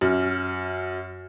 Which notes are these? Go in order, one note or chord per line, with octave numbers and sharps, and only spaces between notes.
F#2